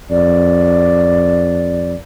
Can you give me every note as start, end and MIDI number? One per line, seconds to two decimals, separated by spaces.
0.11 1.95 41
0.11 1.93 74